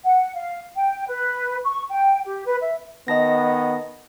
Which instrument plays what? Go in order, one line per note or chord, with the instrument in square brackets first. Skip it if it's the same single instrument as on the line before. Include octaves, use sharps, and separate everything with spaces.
[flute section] F#5
F5
G5
B4
C#6
G5
G4
B4
E5
[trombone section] D#3 B3 [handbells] D#5 A5 A#6